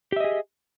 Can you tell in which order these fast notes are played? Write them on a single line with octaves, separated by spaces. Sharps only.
G4 E5 D#5 G#4